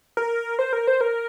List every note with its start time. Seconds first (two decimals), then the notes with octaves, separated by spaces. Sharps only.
0.17 A#4
0.59 C5
0.73 A#4
0.87 C5
1.01 A#4